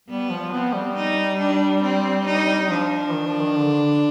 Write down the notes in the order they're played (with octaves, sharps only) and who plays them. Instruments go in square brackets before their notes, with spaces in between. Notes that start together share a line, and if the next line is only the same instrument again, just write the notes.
[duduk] G3 [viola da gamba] B3
[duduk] F3
[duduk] B3 [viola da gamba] C4
[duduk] G3
[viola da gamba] D#4
D4
C4
D#4
[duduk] F3 [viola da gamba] D4
[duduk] D#3
F3
D#3
D3